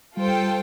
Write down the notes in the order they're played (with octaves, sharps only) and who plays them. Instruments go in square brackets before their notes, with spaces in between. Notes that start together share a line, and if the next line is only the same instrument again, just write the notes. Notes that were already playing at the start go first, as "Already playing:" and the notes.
[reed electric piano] G3 [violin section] F4 A4 C5 G5